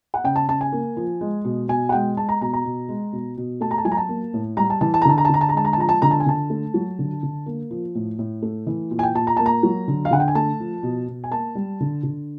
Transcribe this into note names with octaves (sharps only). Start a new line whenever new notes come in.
F#5
C#3 G5
A5
C#3 A5
G#5
A#3
F3
G#3
B2
B2 G#5
F#5
G#3 G5
G#3 A5
A#5
B2 A#5
A#5
B2
G#3
B2
B2
A3 A5
A#5
A5
F#3 G#5
A#5
A5
A#3
A2
G3 A#5
A5
E3 A5
A5
A#5
D3 A5
A#5
A5
D3 A#5
A5
A#5
G#3 A5
A#5
A5
F3 A#5
A5
D3 A#5
A5
G#5
D3 A5
A3
F#3
D3
D3
A#3
F3
A2
A2
A3
E3
A#2
G#5
G5
A#2 A5
A#5
A#3 A5
A#5
F#3
D3
F5
D3 F#5
G5
G#5
A3 A5
F3
B2
B2
G#5
A#3 A5
G3
D3
D3